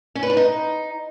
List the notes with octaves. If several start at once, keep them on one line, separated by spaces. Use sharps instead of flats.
C#4
B4
D4
D#4